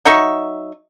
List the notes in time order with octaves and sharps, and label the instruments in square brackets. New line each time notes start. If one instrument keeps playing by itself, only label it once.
[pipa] F#3 D#4 E5 C#6